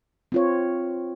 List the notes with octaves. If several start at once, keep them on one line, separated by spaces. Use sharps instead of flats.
C4 F4 C#5